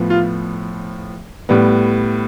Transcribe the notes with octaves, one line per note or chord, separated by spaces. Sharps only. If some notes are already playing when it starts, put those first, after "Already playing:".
Already playing: A2 F3 B3
F4
A2 G3 B3